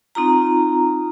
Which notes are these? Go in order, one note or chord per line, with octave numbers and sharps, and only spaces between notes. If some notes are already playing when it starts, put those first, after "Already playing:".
C4 D#4 F4 A#5